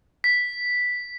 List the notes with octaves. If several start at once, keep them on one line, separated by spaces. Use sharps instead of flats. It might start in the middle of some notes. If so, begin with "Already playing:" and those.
B6